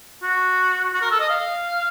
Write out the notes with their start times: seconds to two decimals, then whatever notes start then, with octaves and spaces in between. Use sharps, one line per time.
0.23 F#4
0.93 F#4
1.02 A#4
1.11 A4
1.19 D#5
1.29 F5